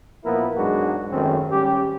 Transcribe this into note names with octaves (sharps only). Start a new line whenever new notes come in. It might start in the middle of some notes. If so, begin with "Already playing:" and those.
A#2 F3 A#3 B3 E4 A#4
E2 G#2 F#3 G#3 D4 F#4
G#1 F#2 D#3 A3 C4 C#4
G#1 G3 C#4 G4